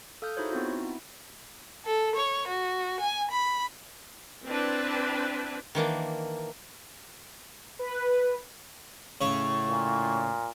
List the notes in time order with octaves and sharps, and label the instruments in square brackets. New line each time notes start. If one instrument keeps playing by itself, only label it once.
[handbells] A4 F5 D#6 F6 G6
D#4 E4 F#4 G#4 C5 C#5
B3 C4 D#4 F4 F#4
E4
[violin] A4
C#5
F#4
G#5
B5
[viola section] C4 D4 E4 B4
[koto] D#3 E3 A#3 D4
[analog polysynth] B4
[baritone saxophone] A2 [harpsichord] C#3 C#5 [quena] C#6
[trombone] A#2